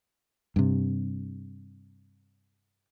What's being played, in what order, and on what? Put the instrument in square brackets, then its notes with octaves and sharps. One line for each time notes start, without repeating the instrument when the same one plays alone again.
[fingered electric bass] G2 C3